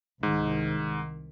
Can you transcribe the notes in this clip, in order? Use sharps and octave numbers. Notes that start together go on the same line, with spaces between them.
C2 G#2 D#3